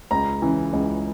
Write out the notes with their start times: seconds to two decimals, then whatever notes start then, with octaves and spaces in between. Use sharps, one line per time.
0.11 C#2 A#5
0.42 C#3 E3
0.73 C#2